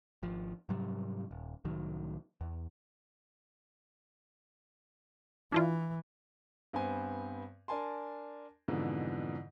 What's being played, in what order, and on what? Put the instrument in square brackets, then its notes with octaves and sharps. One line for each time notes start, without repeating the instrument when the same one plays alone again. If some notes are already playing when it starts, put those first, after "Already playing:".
[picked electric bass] G#1 F3
G#2 C3 F#3 G3
D#1
C2 A2 D#3 F#3
E2
[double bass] E3 [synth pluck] D4 E4 F4
[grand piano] G2 B3 C4 C5 G#5
D4 A#4 G#5 A5 C6
F2 G#2 B2 D3 E3 F3